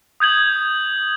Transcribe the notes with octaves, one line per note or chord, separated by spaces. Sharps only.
D#6 G6 G#6 F#7